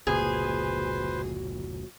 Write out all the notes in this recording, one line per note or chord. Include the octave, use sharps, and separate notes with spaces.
F1 C#2 A#2 F#4 G#4 B4 C5